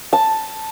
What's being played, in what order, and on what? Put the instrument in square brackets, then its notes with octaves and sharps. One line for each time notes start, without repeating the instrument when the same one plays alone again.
[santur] A5